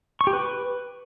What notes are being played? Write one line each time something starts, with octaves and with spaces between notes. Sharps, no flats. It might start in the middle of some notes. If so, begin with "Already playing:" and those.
C#6
G4
B4